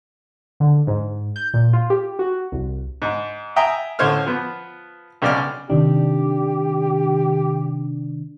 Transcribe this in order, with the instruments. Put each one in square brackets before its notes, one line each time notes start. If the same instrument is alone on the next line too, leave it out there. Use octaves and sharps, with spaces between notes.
[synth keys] D3
G#2
G6
A#2
F4
G4
F#4
C2
[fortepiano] G#2
E5 G5 G#5 A#5 D#6
A2 D3 C#4 C5 C#5 F6
F3 B3
B1 C#3 G4 D5 D6 F6
[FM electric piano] C3 D#3 D4 [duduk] G4